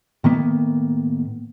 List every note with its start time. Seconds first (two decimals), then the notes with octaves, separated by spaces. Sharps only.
0.24 A2 D#3 A#3 B3